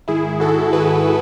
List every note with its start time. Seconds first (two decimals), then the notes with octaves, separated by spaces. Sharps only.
0.08 G#2 D#3 E4 G#4
0.40 F#4 A4
0.73 G#4 B4